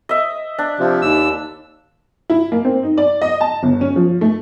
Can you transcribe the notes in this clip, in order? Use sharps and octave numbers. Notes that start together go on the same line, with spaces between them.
D#5 E5
D4
C3 F3
D#2 E6
E4
A#3
C4
D#4
D5
D#5
A5
G1
C#4
F3
A3